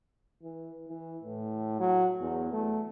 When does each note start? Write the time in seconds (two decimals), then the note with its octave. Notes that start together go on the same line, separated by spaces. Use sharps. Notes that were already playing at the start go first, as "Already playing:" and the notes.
0.43 E3
0.89 E3
1.23 A2
1.80 F#3
2.21 E2
2.53 A3